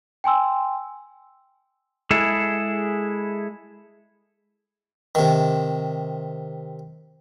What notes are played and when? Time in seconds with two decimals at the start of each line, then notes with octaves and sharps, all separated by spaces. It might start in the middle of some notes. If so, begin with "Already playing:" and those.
0.24 G5 G#5 C6 E6
2.11 G#3 E4 G#4 A4
5.15 C3 D#3